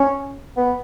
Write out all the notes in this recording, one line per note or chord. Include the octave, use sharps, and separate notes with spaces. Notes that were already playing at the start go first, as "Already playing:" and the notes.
Already playing: C#4
B3